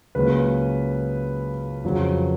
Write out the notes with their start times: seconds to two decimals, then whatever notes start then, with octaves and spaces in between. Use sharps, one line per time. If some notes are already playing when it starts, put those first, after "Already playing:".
0.15 C#2 C#3 F#3 A#3 C#4 B4
1.84 F2 C#3 F#3